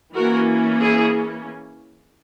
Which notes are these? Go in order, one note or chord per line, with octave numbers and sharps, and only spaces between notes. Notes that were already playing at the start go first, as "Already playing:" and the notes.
E3 A#3 C#4 F#4 A#4
E4 G#4